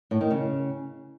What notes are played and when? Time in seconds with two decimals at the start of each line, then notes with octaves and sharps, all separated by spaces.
0.11 A2
0.21 D#3
0.31 C#3